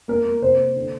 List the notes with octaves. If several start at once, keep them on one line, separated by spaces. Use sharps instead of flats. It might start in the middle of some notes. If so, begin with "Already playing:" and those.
A#3 A#4
A#3
C3 C5
A#3
D3